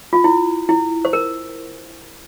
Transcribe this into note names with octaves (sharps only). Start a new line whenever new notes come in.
F4
E4
E4
C5
A#4